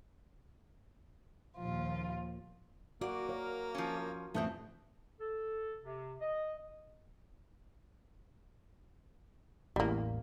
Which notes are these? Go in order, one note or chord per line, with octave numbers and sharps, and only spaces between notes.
D#2 A#2 F3 F4
A#3 F#4 D5
A#4 C#5 F5
F3 C#4
A1 F2 A3 B3 C4 G6
A4
C3
D#5
A1 E2 G3 A#3